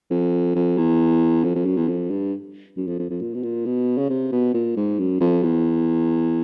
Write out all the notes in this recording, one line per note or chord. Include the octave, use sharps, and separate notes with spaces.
F2
F2
E2
F2
F2
F#2
E2
F2
G2
F#2
F2
F2
F2
A#2
B2
A#2
B2
C#3
C3
B2
A#2
G#2
F#2
F2
E2